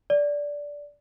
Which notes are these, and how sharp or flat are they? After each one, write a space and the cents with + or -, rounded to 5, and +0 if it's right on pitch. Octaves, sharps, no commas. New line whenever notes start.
D5 -10